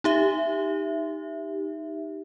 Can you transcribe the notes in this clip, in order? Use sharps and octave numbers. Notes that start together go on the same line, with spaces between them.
D#4 G4 E5